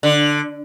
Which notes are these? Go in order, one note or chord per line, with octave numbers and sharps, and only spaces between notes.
D3